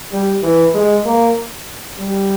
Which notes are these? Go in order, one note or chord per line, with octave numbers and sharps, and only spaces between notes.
G3
E3
G#3
A#3
G3